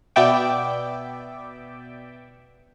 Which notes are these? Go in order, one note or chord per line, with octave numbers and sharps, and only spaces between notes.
B2 B3 D5 E5 G5 D6